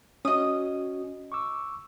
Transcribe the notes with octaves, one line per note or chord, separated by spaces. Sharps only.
C#4 F#4 D#5 D#6
C#6 D6 E6